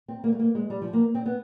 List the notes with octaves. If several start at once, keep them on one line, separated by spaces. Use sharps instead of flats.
C4
A#3
A3
A#3
G#3
G3
F3
A#3
C4
B3